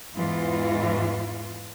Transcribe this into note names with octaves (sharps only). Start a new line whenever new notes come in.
E2 G#2 E3 F4